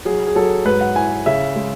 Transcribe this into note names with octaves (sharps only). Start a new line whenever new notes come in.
F#3 G#4
G#4
F#3 A4
G#2 B4
F#5
E4 G#5
C#3 E5
G#3